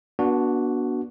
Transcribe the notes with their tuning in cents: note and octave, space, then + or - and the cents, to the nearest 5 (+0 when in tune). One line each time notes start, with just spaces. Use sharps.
B3 -35 D4 -10 F#4 +0